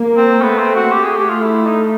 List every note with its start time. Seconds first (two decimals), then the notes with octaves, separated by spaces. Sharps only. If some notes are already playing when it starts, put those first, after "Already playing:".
Already playing: A#3
0.17 C4
0.42 A3 B3
0.58 C4
0.76 F#4
0.92 A3 G4
1.04 G#4
1.16 G4
1.29 F4
1.42 E4
1.66 D#4